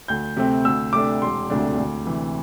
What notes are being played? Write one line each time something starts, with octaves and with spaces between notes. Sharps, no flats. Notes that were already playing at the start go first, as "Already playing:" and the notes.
D2 G6
C3 A3 C4
D2 E6
C3 A3 D4 D6
E1 C6
D2 C3 A3 D4
D2
C3 E3